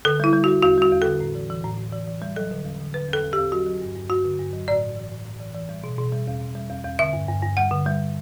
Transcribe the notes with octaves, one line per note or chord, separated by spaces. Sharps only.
D3 A4
G3 E4
G3
G3 F#4
E2 F#4
G3 F#4
E2
D3 A4
A2
E3
E3
A2
A2
E3
E3
G3
F#3 A4
D3
E2
D3
D3 B4
E2
A4
E2
E2 G4
F#3 F#4
F#3
G2
G2
G2 F#4
D3
G2
F#3
A2 D5
A2
E3
A2
A2
E3
E3
G3
B2
B2
G3
E2
B2
G3
E2
E2
D3 E5
G2
G2
G2
G3 F#5
D3
G3